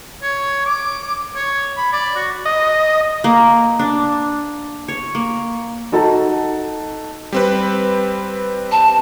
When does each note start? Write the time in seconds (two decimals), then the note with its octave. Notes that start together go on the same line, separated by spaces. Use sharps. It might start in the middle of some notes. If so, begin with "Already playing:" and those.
0.22 C#5
0.66 D6
1.36 C#5
1.77 B5
1.93 D5
2.16 F#4
2.46 D#5
3.24 A#3
3.79 D4
4.88 C#5
5.15 A#3
5.92 D#4 F#4 A4 A5
7.32 G3 C4 B4
8.71 A5